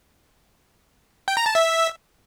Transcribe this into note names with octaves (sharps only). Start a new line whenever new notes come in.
G5
A#5
A5
E5